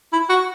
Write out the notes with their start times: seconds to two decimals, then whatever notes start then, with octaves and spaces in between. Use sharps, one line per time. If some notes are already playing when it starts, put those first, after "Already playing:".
0.13 E4
0.29 F#4